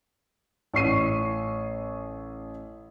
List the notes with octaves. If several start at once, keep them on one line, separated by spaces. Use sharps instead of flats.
A1 C#6 C7 D#7